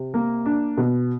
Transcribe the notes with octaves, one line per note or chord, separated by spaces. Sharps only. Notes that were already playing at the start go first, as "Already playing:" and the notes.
Already playing: C3
A#3
D4
B2